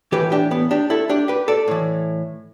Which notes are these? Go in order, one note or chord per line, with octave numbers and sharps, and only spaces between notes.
A2 E3 G4 B4
D4 G4
B3
D4 G4
E4 A4
D4 G4
G4 B4
A4 D5
A2 E3